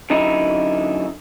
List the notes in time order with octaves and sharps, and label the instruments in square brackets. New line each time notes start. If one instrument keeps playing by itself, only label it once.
[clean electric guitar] F#2 D3 D#4 E4